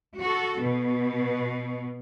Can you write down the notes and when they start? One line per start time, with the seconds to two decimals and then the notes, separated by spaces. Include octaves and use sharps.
0.19 F#4 A4
0.59 B2